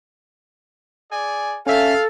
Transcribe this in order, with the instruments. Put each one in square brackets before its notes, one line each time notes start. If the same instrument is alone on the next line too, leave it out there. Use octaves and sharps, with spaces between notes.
[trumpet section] G#4 D5 G#5
[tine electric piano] C#4 E5 [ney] A4 [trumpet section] F5